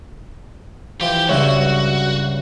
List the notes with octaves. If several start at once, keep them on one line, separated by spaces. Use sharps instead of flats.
E3 F3 G4 G5
C#2 G2 F#4 C#5 E5 F#5